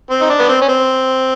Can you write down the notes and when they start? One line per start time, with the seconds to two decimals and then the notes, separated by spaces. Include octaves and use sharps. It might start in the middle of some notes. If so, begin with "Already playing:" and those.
0.10 C4
0.21 D#4
0.30 D4
0.39 B3
0.49 C4
0.62 C#4
0.69 C4